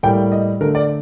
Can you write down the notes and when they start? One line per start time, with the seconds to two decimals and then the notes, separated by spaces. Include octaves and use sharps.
0.03 A2 G3 A#3 G5
0.32 D#5
0.61 D3 A3 A#4
0.75 D5